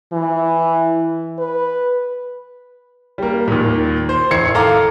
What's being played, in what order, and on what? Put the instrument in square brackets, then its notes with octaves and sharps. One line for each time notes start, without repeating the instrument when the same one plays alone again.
[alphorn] E3
B4
[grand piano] G3 A#3
D#2 A#2
C5
A1 D#3 G#6 C7 C#7
A4 F5 A#5 D6